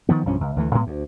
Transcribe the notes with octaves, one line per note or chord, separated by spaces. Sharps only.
D#3 F3 B3
B1 G2 F3 C#4
C#2
D2 E3 A3
A2 G#3 B3
D2